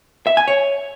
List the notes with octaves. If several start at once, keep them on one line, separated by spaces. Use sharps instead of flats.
E5
G#5
C#5